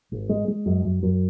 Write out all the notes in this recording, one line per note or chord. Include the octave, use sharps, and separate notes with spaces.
G#1
G#3
G#3
F#2
F#2
F#2